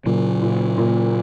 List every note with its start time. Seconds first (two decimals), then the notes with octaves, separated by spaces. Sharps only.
0.06 A#2 C#3 F#3
0.42 A#2
0.78 A#2